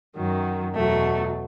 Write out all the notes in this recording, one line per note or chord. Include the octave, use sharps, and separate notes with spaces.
F#2 D#3 F#3
E2 B2 F#3 A3